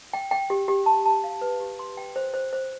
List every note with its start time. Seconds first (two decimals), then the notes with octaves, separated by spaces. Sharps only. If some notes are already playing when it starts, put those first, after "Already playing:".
0.13 G5
0.31 G5
0.50 G4
0.68 G4
0.86 A5
1.05 A5
1.24 F5
1.41 B4
1.60 G4
1.79 C6
1.97 G5
2.16 C5
2.34 C5
2.53 C5